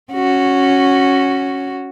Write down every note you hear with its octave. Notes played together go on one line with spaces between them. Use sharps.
C#4 F#4